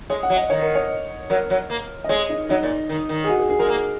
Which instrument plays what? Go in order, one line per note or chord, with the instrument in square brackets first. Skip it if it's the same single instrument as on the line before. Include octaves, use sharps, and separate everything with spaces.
[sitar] G#3 [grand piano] C#5
[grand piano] F#5
[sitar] F#3
[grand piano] D#5
[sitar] D#3 [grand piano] C#5
[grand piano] A#4
C#5
[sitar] F#3 [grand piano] A#4
[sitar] F#3
A#3
[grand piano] D#5
[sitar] G#3 [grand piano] C#5
[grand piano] D#4
[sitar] F#3 [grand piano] D#4
[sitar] A#2
D#3
D#3
[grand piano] G#4
F#4
G#4
G#4
[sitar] G#3 [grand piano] A#4
[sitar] A#3